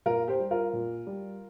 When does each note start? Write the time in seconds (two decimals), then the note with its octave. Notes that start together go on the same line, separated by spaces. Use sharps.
0.06 A#2 F4 A#4
0.28 G4 C5
0.40 G3
0.51 F4 A#4
0.73 A#2
1.07 G3